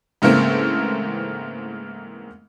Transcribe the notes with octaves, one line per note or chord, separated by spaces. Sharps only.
G#2 C#3 E3 A3 A#3 C4